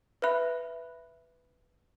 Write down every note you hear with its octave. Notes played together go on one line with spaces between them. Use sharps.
B4 E5 B5 F#6